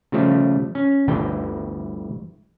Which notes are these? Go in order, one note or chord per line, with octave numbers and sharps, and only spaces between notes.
C#3 F3 G3 A3
C#4
G1 D2 E3 G5